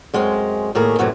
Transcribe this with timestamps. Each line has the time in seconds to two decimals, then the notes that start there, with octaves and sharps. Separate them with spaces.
0.14 F#2 G#3 C4 C#4
0.75 D#2 A2 G#4 A#4
0.99 F#2 A2 C3 E3 F#3